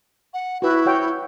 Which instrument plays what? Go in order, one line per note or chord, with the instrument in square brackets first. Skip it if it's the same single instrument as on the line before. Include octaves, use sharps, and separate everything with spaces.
[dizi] F#5
[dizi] E4 [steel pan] F#4 B4
[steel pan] F#4 C#5 G5